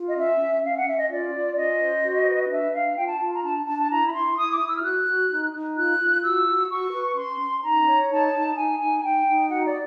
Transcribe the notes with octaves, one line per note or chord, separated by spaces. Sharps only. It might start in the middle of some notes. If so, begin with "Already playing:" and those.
Already playing: F4
D#5
C#4 E5
C#4
C#4 F5
F#5
C#4 E5
D#5
F4 D5
F4
C#4 D#5
C5
F#4
B4
D4 E5
D4 F5
F4 G5
A5
F4 A5
A#5
D4 A5
D4 A5
A5
E4 A#5
B5
E4 C6
E4 D#6
D6
E4 D#6
E6
F6
F#4 F#6
F#4
D#4
D#4
F4 F#6
F4
F#4 E6
F#4
F#4 C#6
B4
C#4 C6
C#4
D#4 A#5
C#5
D#4 A5
D#4
D#4 G#5
D#4 G#5
D#4 G5
D#4
F#4 F#5
D5